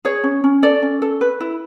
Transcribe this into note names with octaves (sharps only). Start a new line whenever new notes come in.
G#4 C#5
C#4
C#4
A4 D5
C#4
A4
B4
E4